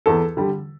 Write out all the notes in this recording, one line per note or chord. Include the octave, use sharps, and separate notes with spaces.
E2 A4
D3 G3